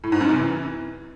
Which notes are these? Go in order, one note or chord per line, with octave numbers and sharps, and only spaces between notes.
A2
G#2
F#2
C3
E3